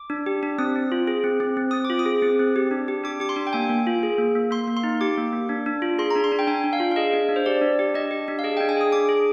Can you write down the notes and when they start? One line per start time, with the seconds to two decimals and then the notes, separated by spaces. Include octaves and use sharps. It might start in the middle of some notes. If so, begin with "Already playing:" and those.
Already playing: D6
0.10 D4
0.26 G4
0.43 D4
0.58 C4 D#6
0.76 C4
0.92 F4
1.07 G#4
1.24 C4
1.40 C4
1.57 C4
1.71 C4 D#6
1.85 D6
1.90 F4
1.99 D#6
2.06 G#4
2.22 C4
2.39 C4
2.56 G4
2.71 D4
2.88 G4
3.04 D4 D6
3.20 G4 D6
3.29 C6
3.36 D4
3.47 G5
3.53 A#3 G#5
3.69 A#3
3.87 F4
4.03 G#4
4.18 A#3
4.35 A#3
4.51 A#3 C6
4.67 A#3
4.77 C6
4.84 D#4
5.01 G4 D6
5.17 A#3
5.33 A#3
5.49 D4
5.66 D4
5.82 F4
5.98 G#4 C6
6.10 A#5
6.15 D4
6.24 C6
6.32 D4
6.39 G5
6.47 D4 G#5
6.64 D4
6.73 F5
6.80 F4
6.91 F5
6.96 G#4 D#5
7.13 D4
7.29 D4
7.36 C5
7.46 G4 D5
7.62 D4
7.79 G4
7.94 D4 D#5
8.11 G4
8.28 D4
8.39 F5
8.44 G#4 D#5
8.57 G5
8.60 D4
8.69 G#5
8.77 G#4 D#6
8.92 D4 D6
9.09 G#4